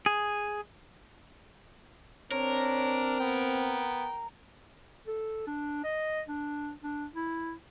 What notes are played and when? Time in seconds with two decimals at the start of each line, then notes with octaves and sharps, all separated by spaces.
0.06 G#4
2.32 C4 D4 A#4 C#5
3.20 B3 G5
5.07 A4
5.47 D4
5.84 D#5
6.28 D4
6.84 D4
7.15 E4